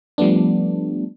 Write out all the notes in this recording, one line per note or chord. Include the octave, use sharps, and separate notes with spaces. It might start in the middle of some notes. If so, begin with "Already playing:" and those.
F3 G3 A3 B3 D4